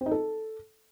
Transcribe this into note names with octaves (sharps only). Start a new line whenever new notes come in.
C4
D#4
A4